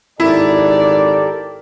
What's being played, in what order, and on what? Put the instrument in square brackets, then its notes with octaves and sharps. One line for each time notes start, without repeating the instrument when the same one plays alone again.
[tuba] G#1 [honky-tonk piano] E4 [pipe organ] G4 A4 A#4 [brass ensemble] D5